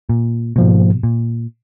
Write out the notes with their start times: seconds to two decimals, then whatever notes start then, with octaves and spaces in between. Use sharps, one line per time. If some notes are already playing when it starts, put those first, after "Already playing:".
0.09 A#2
0.56 G#2 B2 F3 A#3
1.03 A#2